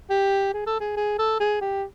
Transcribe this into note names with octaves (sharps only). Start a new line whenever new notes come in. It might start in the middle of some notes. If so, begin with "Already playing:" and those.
G4
G#4
A4
G#4
G#4
A4
G#4
G4